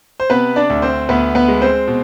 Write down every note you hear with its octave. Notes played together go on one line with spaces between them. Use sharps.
C5
C3 B3 B4
D4 D5
D2
C4 C5
D2 B3 B4
B3 B4
G#3
C4 C5
B2